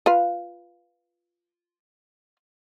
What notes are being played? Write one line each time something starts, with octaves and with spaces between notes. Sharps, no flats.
F4 B4 F5